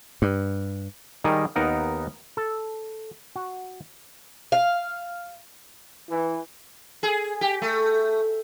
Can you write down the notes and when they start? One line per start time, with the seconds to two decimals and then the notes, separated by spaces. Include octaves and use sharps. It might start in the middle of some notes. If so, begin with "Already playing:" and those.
0.22 G2
1.24 D#3 G3 D#4 G#4 A#4
1.56 D#2 B3 D#4 A#4 F#5
2.37 A4
3.36 F#4
4.52 F5
6.09 E3
7.03 G#4
7.41 G4
7.62 A3